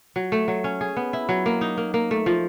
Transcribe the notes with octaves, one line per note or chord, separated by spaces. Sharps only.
F#3
A3
F#3
C#4
G#4
B3
E4
F#3
A#3
D#4
A#3
A#3
A3
F3